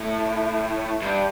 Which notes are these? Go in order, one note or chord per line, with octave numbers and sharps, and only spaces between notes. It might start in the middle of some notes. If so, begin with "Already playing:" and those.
Already playing: A2
G2